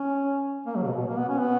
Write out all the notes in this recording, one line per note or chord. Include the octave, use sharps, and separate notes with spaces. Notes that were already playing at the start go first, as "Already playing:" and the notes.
Already playing: C#4
A#3
F#3
C#3
B2
B2
A#3
B3
C#4
B3